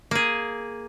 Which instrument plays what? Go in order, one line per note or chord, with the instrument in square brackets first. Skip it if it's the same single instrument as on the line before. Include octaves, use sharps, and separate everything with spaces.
[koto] A#3 G#4